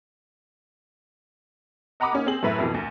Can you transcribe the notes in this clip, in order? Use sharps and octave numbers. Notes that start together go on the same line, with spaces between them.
D#5 F#5 A#5 B5 D6 D#6
A#3 C#4 D#4
C4 G#4 F#7
F#2 A2 B4 E5
F2 B2 E3
D2